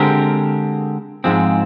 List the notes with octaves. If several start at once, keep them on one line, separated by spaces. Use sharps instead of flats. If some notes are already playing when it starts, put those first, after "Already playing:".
Already playing: D3 G#3 C4 G4 A#4
G#2 F3 G#3 C4